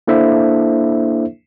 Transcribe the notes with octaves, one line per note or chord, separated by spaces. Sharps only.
A#3 D4 E4 A4 C5 E5